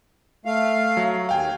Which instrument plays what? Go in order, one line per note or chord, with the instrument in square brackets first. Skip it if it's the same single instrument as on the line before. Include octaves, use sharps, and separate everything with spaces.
[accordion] A3 F5
[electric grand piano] F#3
[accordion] D#2 [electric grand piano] F5 G5 G#5